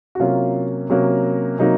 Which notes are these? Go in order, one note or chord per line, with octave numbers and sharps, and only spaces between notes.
F#4
C3 F#3 A#3 C#4 F4
C3 F#3 A#3 C#4
C3 F#3 A#3 D#4